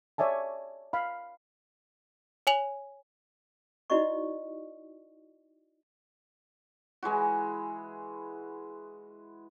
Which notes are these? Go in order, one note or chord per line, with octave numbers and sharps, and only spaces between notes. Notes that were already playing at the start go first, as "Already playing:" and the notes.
C#5 D5 E5 G#5 A5
F5 B5
C#5 G#5 F7 F#7
D#4 E4 F#4 D5 D#5 C#6
E3 G#3 E4 F#4